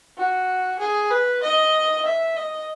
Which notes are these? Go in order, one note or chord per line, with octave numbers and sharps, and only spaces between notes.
F#4
G#4
B4
D#5
E5
D#5